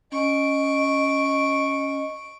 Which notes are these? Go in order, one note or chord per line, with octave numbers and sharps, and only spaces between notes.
C#4 D#5 C#6 D7